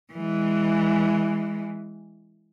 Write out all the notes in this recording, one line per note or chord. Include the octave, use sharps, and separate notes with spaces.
E3 G#3